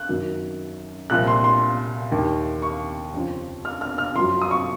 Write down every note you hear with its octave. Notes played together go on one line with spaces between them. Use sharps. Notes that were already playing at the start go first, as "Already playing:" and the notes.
Already playing: F#6
F#2 D#3
C2 A#2 F3 F#6
C6
C6
D#2 D#3
C#6
F2 C#3 F3
F6
F6
F6
F#2 F3 C6
D#6
C#6